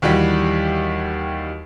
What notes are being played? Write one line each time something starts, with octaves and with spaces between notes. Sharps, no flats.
D#2 E3 G3 F#4 G4